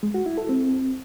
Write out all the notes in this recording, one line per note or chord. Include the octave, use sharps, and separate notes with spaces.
G#3
F#4
E4
A4
C4